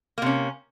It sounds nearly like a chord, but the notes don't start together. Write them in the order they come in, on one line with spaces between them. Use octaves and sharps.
A#3 C3 C#4